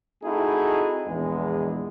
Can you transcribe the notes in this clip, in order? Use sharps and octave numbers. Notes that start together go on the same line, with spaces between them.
A3 C4 D#4 E4 F#4 G#4
A#1 E2 G#3